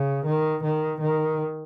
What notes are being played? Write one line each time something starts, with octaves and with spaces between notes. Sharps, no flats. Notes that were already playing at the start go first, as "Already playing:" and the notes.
Already playing: C#3
D#3
D#3
D#3